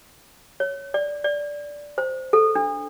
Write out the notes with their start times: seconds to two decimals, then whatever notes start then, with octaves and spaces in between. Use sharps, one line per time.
0.60 C#5
0.94 D5
1.24 D5
1.98 C5
2.33 A4
2.55 D4